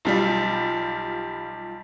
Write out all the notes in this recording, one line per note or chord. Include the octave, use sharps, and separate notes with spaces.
B1 F3 G3